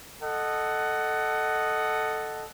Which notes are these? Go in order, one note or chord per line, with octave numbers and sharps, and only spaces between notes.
A4 D#5 F#5